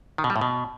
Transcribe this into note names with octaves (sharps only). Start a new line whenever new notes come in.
D#3
B2
G3
A2
B2